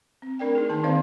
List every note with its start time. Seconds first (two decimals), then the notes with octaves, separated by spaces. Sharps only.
0.22 C4
0.39 A3 C4 D4 A#4 D5 G5
0.55 D#4 G#4
0.69 D#3 A#3 A5
0.84 D#3 C4 C5 D5 F5